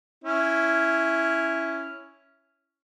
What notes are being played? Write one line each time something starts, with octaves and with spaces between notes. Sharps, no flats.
C#4 E4